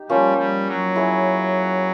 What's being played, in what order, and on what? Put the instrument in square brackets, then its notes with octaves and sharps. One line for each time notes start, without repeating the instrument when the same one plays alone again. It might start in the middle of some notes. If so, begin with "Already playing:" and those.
Already playing: [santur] D#4 G4
[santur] F3 A#3 C#4 [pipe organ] G3
[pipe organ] G3
F#3
[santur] E4 G#4 C#5